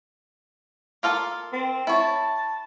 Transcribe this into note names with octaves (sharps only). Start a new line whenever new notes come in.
A#3 F4 A4
C4
E4 C#5 A5